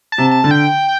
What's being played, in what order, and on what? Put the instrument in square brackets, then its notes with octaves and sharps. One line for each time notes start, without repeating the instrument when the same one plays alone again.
[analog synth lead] A5
[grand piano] C3
[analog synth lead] A5
[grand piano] D3
[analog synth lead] G5